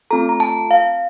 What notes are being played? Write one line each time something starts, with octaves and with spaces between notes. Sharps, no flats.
A3 C4 F4 A4 A#5
A#5
A5
F5